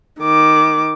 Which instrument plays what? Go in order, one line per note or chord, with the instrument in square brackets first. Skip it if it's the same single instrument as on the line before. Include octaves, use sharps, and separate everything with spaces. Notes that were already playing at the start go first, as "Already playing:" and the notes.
[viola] D#3 D6